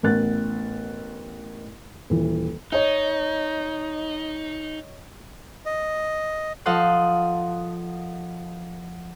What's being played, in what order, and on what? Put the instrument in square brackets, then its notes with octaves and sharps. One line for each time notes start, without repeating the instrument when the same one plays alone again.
[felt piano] A1 B3 A#4 F#6 A6
D#1 E3
[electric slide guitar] D#4 [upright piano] C#5 D#5
[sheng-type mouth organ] D#5
[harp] F3 A4 D#5 F5 F#5 C6